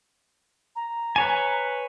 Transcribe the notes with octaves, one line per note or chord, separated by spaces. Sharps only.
A#5
B4 C#5 G#5